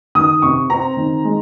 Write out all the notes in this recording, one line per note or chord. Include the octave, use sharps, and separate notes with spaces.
D#3 D#6
C3 C#6
C4 A#5
D#3
G#3